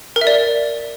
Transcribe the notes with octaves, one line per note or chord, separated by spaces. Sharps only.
A#4
E5
D5